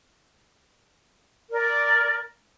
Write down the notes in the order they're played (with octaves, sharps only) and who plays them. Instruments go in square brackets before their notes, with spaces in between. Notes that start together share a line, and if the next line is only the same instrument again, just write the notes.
[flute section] A#4 D5